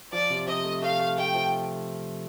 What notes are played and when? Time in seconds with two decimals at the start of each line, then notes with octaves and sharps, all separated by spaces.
0.12 F3 D5
0.30 C3
0.47 C3 D#5
0.65 A3
0.82 A3 F5
1.00 A3
1.18 A3 G5
1.35 F3